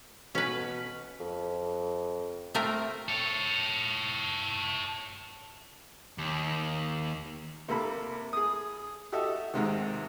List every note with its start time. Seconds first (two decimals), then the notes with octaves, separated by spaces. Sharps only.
0.35 B2 C#4 B4
1.20 F2
2.55 A3 C4 A#4
3.08 A4 C#5
6.18 D#2
7.68 C3 A#3 A4 B5
8.33 G#4 D#6
9.12 F#4 G4 A4 D#5 E5
9.54 D#2 G#2 C3 D#3